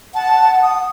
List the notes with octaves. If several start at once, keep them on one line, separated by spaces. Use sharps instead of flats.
F#5 A5
D#6